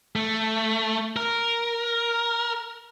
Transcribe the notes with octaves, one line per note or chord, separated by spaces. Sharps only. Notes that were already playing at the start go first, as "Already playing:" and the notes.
A3
A#4